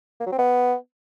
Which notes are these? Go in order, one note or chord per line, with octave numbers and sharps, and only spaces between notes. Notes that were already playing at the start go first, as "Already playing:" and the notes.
A#3
F#3
C4
B3